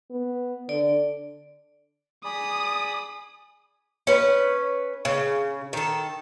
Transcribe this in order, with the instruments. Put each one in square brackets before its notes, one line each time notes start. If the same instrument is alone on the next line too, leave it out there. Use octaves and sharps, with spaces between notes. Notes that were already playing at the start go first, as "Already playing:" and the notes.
[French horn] B3
[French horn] D3 [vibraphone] D5
[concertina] G#4 D5 B5 [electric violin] D#6
[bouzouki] C#4 B4
C#3
D#3 A4